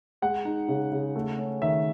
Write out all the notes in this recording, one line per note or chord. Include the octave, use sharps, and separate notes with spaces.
G#3 F#5
D#4
C#3
C#3
A3
C#4
D#3 E5